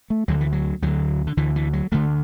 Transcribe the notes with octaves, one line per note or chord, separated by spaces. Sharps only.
A3
D2 D3 F#3
E3
F#3
D2 D3 F#3
D3
D2 D3 E3
E3
F#3
D2 D3 A3